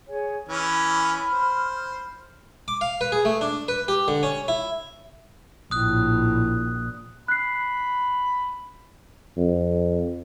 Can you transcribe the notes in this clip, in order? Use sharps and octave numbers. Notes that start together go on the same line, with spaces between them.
G#4 C#5 G#5
E3 C#4 B5 F6
C5
D6
F5
B4
G#4
A3
D4
B4
G4
D3
C#4
E4
A#1 A2 D#6 F#6
B5 F#6 C7
F2